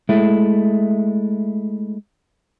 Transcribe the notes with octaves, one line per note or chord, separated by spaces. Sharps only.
G#3 A3 E4